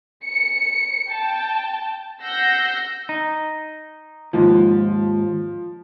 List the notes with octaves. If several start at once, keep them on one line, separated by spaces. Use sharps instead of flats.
C#7
G5 A5
F#5 E6 G6 A#6 C7
D#4
D#2 G#2 F3